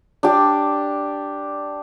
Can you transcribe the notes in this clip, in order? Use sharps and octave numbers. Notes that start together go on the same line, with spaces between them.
D4 G4